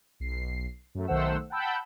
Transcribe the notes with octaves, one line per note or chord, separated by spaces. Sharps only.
B1 C7
F#2 A3
B1 D#3 A3 C5 F#5 E6
F#5 G5 A5 B5 E6 G6